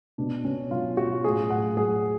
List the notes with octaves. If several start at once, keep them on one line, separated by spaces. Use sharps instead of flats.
B2 D4
B2 C#4
F#3 F4
F#3 F#4
A2 G#4
A2 F#5
F#3 G#4